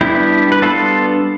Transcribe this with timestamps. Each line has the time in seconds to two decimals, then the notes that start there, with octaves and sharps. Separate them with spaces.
0.01 G3 B3 D4 E4 G4
0.52 B4
0.62 G3 B3 D4 F4 A4